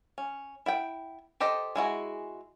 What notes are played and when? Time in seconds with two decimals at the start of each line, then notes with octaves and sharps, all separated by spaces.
0.18 C#4
0.66 E4 F#5 G5
1.40 G4 A4 C5 D#5
1.75 G#3 E4 F#4 G#4